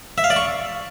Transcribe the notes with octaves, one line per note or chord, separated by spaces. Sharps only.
E5
F5
D5
C#6